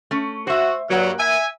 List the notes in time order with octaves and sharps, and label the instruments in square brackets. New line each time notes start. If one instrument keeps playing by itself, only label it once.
[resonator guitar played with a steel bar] A3 C#4
[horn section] F#4 [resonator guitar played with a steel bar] C5 E5
[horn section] G2 F#3 [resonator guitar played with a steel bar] A#3 F#5
[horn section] E5 G#5